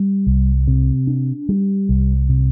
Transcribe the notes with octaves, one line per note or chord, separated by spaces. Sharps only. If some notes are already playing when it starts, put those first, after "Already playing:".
Already playing: G3
C2
C3
D4
G3
C2
C3